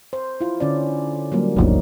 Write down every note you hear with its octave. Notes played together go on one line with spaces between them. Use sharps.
C5
E4 F4
D3 C#4 D5
F#3 G3 A#3
D1 G1 D2 F3 A#3 D#4